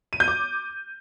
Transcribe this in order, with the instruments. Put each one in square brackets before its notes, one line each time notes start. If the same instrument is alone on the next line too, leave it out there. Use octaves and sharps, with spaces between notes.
[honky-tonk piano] D#7
G6
D6